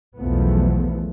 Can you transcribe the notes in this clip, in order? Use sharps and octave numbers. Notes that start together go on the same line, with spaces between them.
B1 E2 F3 A3 B3